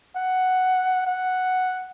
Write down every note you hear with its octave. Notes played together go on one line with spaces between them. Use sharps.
F#5
F#5